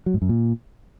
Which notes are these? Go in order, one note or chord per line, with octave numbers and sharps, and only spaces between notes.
F#3
G#2
F#2
A#2